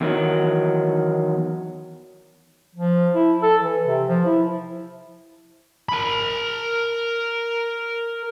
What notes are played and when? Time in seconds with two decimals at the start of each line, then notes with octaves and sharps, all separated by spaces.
0.01 E2 D#3 F#3
2.75 F3
3.15 E4
3.43 A4
3.62 E3
3.86 C3
4.07 F3
4.25 E4
5.89 A#4 B5